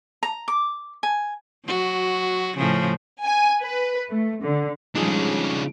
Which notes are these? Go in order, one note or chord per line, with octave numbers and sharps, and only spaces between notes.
A#5
D6
G#5
F#3 F#4
A2 C#3 F3
G#5
B4
A3
D3
C#3 F3 G3 G#3 D4 D#4 F4 G#4